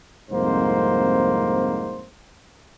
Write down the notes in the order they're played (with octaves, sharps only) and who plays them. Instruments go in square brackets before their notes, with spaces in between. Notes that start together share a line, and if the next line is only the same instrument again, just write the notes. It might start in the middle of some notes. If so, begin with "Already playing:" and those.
[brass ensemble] C2 F2 G#2 A#3 C5